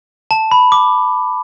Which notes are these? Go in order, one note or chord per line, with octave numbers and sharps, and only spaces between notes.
A5
B5
D6